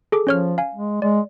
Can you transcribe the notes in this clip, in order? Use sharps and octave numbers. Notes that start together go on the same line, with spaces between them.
G#4 A4 D6
F3 C#4 C#5 F6
F5 G#5
G#3
G#3 D5